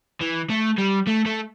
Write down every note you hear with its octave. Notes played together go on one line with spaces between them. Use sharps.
E3
A3
G3
A3
A3